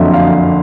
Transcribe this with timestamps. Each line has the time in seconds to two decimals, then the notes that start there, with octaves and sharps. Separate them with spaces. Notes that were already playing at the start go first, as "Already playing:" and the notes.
Already playing: F#1 F2 D3 F#3 D#5 E5
0.13 F5